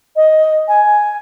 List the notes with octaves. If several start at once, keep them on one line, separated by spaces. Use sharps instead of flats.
D#5
G#5